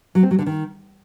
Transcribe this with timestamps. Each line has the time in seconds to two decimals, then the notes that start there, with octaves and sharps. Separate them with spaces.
0.15 F#3
0.23 C4
0.31 F#3
0.39 D3
0.46 D#3